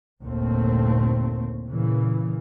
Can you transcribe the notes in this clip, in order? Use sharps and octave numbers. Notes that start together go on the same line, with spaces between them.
G1 D#2 A#2 A3 C4
A#2 C#3 E3